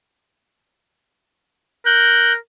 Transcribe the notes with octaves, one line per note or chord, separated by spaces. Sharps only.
A#4 F#6 G6